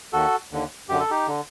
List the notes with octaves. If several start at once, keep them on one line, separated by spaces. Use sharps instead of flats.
D#2 D#3 F#4 A4
D#2 D3
F#2 D3 G4
A4
D#4 G4
D3